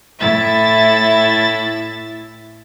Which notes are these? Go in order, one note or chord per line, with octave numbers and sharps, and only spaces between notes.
A2 E4 E5 A6